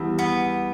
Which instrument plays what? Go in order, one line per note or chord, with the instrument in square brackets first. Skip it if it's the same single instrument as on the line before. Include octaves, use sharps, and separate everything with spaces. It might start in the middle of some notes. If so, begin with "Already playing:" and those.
Already playing: [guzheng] E2 G3 [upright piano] E3
[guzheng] B3